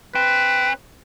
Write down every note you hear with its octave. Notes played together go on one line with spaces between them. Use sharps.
C4 B4